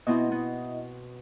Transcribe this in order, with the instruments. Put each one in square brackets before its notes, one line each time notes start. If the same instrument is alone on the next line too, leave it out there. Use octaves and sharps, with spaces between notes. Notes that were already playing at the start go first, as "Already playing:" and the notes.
[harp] B2 B3 C4 [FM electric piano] E4 D#5
[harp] B3